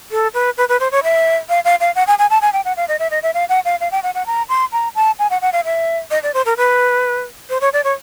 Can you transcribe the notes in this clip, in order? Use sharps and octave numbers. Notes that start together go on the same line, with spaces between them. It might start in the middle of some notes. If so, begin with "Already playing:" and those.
A4
B4
B4
B4
C5
C#5
E5
F5
F5
F5
F#5
G#5
G#5
A5
G#5
G5
F#5
F5
D#5
E5
D#5
E5
F5
F#5
F5
F5
G5
F#5
F#5
A#5
C6
A#5
A5
G#5
F#5
F#5
F5
E5
D#5
D5
C5
A#4
B4
C5
C#5
D5
C#5